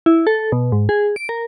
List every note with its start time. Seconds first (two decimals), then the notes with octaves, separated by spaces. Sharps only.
0.06 E4
0.27 A4
0.52 B2
0.72 G#2
0.89 G#4
1.16 D7
1.29 A#4